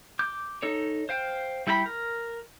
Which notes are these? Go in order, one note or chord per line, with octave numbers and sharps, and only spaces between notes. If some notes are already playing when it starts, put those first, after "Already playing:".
D6 G6
D#4 A4 C#5
C5 F5 G5
G3 E4 G5 A5 B5
A#4